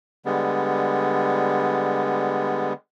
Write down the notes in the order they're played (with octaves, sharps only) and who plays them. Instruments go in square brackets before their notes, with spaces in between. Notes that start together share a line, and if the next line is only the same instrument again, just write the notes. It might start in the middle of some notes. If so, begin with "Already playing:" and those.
[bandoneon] D3 G3 G#3 B3